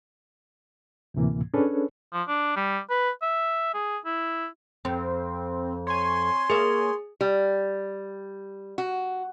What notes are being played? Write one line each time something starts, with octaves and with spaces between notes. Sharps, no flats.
D2 A2 C3 E3 A#3
C#4 D4 G#4 A4 B4 C#5
F3
D4
G3
B4
E5
G#4
E4
F2 C4
C#5 G#5 C6
A#3 G#4 E5
G3
F#4